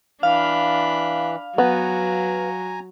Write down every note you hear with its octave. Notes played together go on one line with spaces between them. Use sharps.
E3 D4 F5 B5
F#3 B3 G#5 A#5